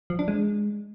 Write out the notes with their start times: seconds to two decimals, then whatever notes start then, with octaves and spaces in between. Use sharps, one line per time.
0.10 F3
0.19 D4
0.28 G#3